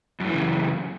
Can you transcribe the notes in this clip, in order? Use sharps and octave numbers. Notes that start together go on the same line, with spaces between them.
F#2 A2 C#3 E3